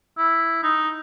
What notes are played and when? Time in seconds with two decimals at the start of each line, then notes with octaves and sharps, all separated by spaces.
0.18 E4
0.63 D#4